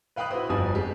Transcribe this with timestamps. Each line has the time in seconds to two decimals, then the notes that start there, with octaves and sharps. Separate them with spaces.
0.16 B4 F5 G5 B5 D#6 F#6
0.31 E4 F#4 B4 C5 D#6
0.49 G1 F2 F3 G3 G#5 D#6
0.75 G#3 G4